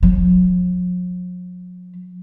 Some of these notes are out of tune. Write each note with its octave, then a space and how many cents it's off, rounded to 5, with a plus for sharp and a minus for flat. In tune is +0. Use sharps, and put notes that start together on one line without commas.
F#3 -45